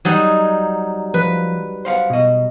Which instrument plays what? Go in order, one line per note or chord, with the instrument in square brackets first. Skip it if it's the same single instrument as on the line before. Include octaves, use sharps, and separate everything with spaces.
[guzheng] F#3 G3 D#4
[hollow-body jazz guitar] F3 [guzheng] B4
[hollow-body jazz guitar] C5 F5 F#5
B2 D#5